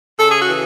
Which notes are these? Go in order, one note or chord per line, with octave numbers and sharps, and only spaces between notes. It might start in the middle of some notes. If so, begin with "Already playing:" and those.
C#3 A4
G#4
F#4
E3